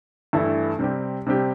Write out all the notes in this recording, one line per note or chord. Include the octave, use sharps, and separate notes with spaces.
G2 E3 A3 E4 A4
C3 G3 C4 G4
C3 G3 C4 G4